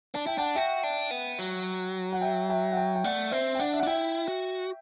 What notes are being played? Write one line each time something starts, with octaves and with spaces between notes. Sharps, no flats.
D4 A5
E4 G5
D4 F#5 A5
F#4 E5 G5
D4
B3
F#3
F#5
E5 G5
E5 G5
F#5
E5 G5
G5
A3 D5 F#5
C4 C5 E5
G5
D4 D5 F#5
E5
F#5
D4
E4 E5 G5
F#4